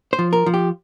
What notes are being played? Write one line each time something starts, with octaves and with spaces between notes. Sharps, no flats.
C5
F3
A#4
F3
G4